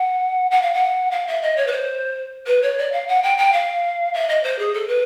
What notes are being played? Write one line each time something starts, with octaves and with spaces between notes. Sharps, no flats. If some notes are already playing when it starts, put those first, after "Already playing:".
Already playing: F#5
F#5
F5
F#5
F5
E5
D#5
C#5
B4
C5
B4
C#5
D5
F5
F#5
G5
G5
F5
E5
D#5
C5
G#4
A4
B4